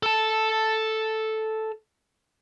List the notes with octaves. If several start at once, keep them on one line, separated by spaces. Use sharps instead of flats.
A4 A5